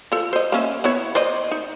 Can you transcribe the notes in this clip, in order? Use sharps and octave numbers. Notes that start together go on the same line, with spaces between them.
F3 A4
C5 D#5
A#3 C#4 E5
B3 E4 C#5
C5 D5 D#5
D#4